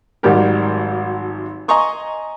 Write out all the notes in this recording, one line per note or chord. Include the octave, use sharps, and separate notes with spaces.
G#1 G#2 F#3 G3 G4 A#4
D#5 G#5 A#5 C6 C#6 D#6